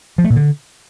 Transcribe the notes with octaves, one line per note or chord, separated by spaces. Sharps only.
F3
A3
A#2
D3